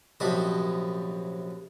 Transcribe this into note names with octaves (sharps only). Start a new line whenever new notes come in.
A#1 F#2 C3 D4 D#5 B5